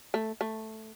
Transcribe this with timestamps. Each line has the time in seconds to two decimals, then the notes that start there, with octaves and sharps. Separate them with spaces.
0.14 A3
0.41 A3